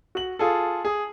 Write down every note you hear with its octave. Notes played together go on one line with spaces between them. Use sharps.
F#4 F#7
F4 G#4 A4
G#4